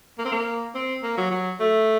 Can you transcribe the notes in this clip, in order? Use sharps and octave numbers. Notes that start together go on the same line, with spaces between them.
A#3
C4
A#3
C4
A#3
F#3
F#3
A3